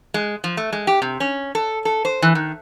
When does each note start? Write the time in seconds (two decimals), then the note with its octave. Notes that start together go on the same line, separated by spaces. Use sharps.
0.14 G#3
0.44 F3
0.57 A3
0.73 G#3
0.87 G4
1.02 C3
1.20 C#4
1.55 A4
1.85 A4
2.05 C5
2.22 E3
2.35 D#3